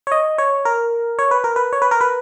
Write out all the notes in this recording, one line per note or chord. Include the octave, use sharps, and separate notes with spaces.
C#5
D#5
C#5
A#4
C#5
B4
A#4
B4
C#5
B4
A#4
B4